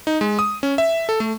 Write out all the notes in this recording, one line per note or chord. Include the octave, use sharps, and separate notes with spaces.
D#4
G#3
D#6
C#4
E5
A4
A3